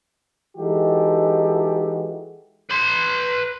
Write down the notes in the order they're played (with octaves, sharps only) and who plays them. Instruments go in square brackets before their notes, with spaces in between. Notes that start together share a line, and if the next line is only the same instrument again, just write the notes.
[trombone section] E3 G#3 D#4 F#4 G4 A4
[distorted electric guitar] B4 C6